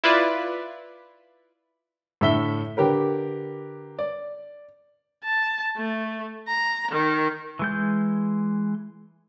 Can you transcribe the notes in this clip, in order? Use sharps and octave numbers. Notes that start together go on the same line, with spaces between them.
E4 F4 B4 D5
A2 D3 A4 E5 B6 G7
D3 G4 A#4 B4
D5
A5
A3
A#5
D#3
E3 G#3 G6